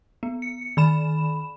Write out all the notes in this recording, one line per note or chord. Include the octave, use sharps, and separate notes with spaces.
B3
C#7
D#3 B5 E7